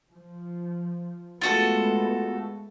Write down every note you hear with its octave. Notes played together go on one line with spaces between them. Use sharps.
F3
G#3 A3 B3 F4 F#4 A4